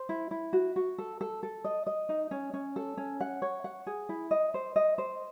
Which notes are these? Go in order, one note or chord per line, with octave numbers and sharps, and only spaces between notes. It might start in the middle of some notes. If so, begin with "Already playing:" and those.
Already playing: C5
E4
E4
F#4
F#4
A4
A4
A4
D#5
D#5
D#4
C#4
C#4
A4
C#4
F#5
C#5
F#5
G#4
E4
D#5
C5
D#5
C5